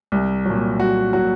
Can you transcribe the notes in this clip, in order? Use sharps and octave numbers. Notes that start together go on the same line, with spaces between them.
C2
A#2 F#3
C2 F#4
A#2 F#3 F#4